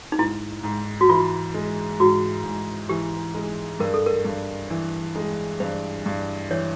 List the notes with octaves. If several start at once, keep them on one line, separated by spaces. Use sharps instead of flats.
D#4
G#2 E4
G#2
F#4
E3 F4
G#3
G#2 F#4
G#2
E3 G4
G#3
G2 A#4
A4
A#4
G2
E3
G#3
G2 C5
G2
E3 C#5